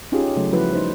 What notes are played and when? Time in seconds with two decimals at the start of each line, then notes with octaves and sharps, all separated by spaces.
0.12 C#4 D#4 F4 G4 G#4
0.36 C#3 F#3 A3
0.52 F3 G3 E4 F#4 B4
0.73 D#4 C5